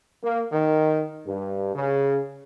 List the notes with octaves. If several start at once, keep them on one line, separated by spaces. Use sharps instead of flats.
A#3
D#3
G2
C#3